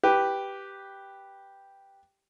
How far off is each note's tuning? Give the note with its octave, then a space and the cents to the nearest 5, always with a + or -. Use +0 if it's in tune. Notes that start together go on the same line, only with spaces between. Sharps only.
G4 +0 B4 +0